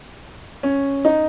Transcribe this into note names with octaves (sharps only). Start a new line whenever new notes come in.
C#4
D#4